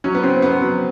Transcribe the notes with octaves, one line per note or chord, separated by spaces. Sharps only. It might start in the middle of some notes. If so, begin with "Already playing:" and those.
F#3 C#4
B3
C#3 C4
F#3 B3
F#3